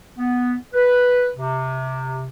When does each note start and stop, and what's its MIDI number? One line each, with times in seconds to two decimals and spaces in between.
0.18 0.55 59
0.74 1.29 71
1.36 2.26 48